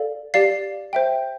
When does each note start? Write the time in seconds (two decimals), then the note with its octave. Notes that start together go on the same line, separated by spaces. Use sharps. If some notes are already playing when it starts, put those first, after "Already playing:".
Already playing: A4 D5 F5
0.34 G4 D5 F5 C7
0.93 C5 E5 G5